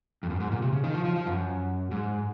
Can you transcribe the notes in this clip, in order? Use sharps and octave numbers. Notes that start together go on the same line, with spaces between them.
F2
F#2
G#2
A#2
C3
C#3
D#3
F3
F3
F3
F#2
G#2